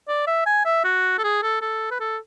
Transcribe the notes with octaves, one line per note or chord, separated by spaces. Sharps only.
D5
E5
G#5
E5
F#4
A4
G#4
A4
A4
B4
A4